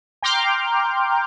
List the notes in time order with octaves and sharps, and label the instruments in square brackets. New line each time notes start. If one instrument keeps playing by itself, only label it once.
[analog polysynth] G5 A#5 C6 D6 F6 G6